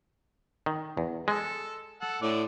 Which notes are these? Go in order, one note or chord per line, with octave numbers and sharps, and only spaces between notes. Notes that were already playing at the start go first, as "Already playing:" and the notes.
D#3
E2
G#3 A4
A4 F#5
A2 D3 D5